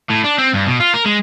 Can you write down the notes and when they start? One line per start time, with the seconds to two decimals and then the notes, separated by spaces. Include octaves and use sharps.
0.10 A2
0.24 D4
0.38 C4
0.54 G2
0.67 B2
0.80 F4
0.94 A#4
1.06 G#3